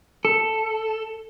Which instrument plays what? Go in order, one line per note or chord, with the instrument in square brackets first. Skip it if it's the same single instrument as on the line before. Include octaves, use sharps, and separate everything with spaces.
[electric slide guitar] A4